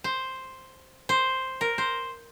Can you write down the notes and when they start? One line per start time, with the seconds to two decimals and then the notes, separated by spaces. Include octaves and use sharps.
0.04 C5
1.09 C5
1.61 A#4
1.78 C5